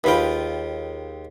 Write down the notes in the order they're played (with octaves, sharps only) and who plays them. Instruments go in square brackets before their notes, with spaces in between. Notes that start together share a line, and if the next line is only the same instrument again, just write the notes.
[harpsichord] D#2 G#3 G5 [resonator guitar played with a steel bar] F4 B4